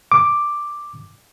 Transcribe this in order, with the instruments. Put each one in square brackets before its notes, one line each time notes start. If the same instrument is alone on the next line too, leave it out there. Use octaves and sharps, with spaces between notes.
[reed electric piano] D6